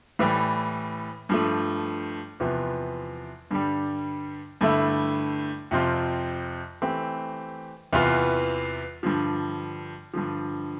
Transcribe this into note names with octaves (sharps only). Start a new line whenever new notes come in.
A2 E3 G3
G2 F3 A3
E2 C3 F3 B3
G2 D3 G3
G2 D3 A3 E4
F2 C3 F3 C4 F4
E3 A3 C4 G4
E2 C3 E3 B3 F4
G2 D3 F3
G2 D3 F3